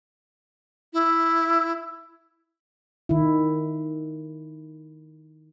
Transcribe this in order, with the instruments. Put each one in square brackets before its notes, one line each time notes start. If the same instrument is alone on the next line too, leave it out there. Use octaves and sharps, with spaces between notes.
[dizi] E4
[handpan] D#3 E4